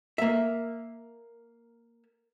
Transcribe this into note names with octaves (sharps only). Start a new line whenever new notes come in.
A#3 E5